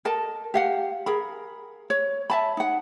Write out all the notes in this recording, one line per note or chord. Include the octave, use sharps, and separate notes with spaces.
A4 A#4 D#5 A5
G4 F5 F#5
G#4 A#4 B5
C#5
E5 A5 B5
D#4 F#5